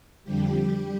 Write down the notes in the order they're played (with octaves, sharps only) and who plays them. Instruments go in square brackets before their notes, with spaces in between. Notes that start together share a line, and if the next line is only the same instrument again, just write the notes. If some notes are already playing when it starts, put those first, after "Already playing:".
[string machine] F2 D3 F3 G3 G4